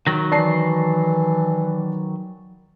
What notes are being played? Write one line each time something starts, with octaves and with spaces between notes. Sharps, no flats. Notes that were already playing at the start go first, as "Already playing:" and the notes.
D#3 F#3 A#6
E3 D5 A5 C7